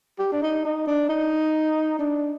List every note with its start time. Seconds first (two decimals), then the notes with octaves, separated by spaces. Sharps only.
0.19 G4
0.32 D4
0.42 D#4
0.65 D#4
0.87 D4
1.09 D#4
1.99 D4